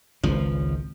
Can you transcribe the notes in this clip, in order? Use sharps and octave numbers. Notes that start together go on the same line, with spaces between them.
G#1 C#2 F3